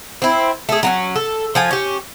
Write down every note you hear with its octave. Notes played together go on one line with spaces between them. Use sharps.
C4 E4
A3 G#4
F#3 A3 C#4
A4
F3 F4 G#5
C#4 G4